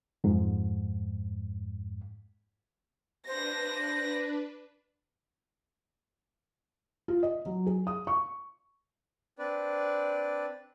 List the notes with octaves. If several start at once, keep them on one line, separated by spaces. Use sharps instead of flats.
F2 G#2
D4 B4 C5 A#6
F4
D#5
F#3
G#4
D#6
C#6
C4 D4 B4 D5